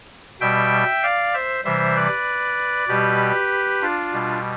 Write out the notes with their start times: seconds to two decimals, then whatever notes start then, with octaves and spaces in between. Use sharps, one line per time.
0.41 B2 G3 E5 G5
1.03 D5 F5
1.34 C5 E5
1.65 C3 E3 G3 C5 E5
1.96 B4 D5
2.88 B2 G3 G4 B4
3.82 D4 F4
4.13 B2 G3